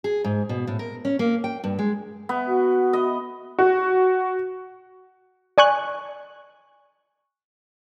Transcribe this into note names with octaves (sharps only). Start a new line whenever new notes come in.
G#4
G#2
B2
A2
A#4
C#4
A#3
G5
G2
G#3
B3
F#4
D#5
F#4
D5 G#5 C#6 F#6